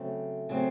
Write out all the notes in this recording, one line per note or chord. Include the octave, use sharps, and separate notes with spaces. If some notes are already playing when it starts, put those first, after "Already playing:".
Already playing: C#3 F#3 A3 C4
C#3 F#3 A3 C4